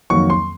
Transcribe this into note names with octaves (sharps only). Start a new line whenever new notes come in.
F2 D#3 F#3 A#3 C#6
C6